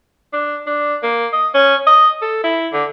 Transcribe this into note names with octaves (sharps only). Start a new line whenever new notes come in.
D4
D4
A#3
D#5
C#4
D#5
A4
E4
D3